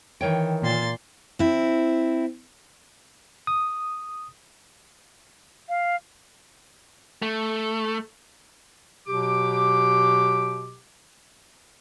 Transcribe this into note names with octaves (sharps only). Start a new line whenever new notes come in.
D#3 E3 C#5 G5
A#2 C6 A6
C4 E4
D#6
F5
A3
B2 F#3 G4 D6